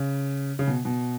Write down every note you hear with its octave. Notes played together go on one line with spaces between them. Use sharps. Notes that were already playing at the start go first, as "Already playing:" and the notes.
Already playing: C#3
C#3
B2
B2